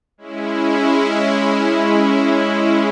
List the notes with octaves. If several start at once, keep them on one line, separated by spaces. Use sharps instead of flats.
G#3 C#4 E4